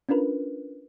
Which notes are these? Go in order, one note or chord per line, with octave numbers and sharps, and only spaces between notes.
C#4 D4 F4 A#4 B4